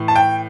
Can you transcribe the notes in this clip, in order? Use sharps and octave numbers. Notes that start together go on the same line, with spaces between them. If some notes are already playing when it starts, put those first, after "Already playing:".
Already playing: A2 E3
A5
G5